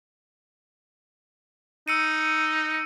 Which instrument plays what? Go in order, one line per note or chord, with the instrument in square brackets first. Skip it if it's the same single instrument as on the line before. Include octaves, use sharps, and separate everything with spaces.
[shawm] D#4 [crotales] E6 C#7 D#7